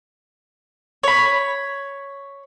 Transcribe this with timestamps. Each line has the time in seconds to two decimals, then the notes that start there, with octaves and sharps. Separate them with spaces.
1.03 C#5 B5